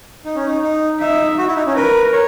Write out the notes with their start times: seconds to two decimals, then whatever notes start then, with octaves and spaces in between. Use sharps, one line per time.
0.25 D#4
0.35 C#4
0.47 D#4
0.62 D#4
1.00 D#4 E5
1.38 F#4
1.47 E4
1.56 D#4
1.67 C#4
1.75 A#4 B4
2.13 C#5